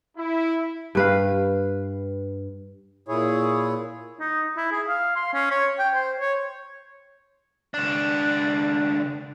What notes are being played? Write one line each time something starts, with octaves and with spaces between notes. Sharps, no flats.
E4
G2 B4 F5
A#2 E4 G#4 C#5
D#4
E4
G#4
F5
C6
C#4
C#5
G5
C5
C#5
C#2 D4